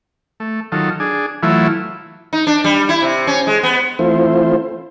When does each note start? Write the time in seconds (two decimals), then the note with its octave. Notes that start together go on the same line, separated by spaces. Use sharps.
0.40 A3
0.72 D#3 F#3 F4 A4
1.00 D4 G#4
1.43 E3 F#3 A3 E4 F4
2.33 D#4
2.47 D4
2.64 G3
2.89 E4
3.02 C3
3.27 C#4
3.47 G#3
3.63 B3
3.99 E3 A3 C4 E4 F4 C5